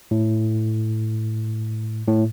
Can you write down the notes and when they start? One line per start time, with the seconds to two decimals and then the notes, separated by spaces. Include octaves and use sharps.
0.11 A2
2.07 A2